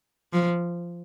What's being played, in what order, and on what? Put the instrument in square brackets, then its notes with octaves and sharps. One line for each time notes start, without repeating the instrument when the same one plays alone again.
[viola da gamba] F3